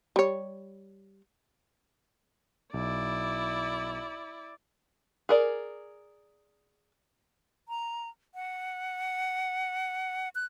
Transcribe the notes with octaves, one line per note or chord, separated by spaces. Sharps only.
G3 C#5
B1 E4 D5
G#4 A#4 D5
A#5
F#5
F#6